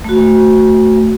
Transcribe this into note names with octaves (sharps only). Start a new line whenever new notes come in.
A3 F#4